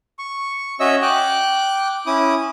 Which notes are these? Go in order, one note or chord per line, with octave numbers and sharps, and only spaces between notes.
C#6
C#4 F#4 C#5 D#5 E5 E6
G5 D6 F#6
C#4 E4 D6 D#6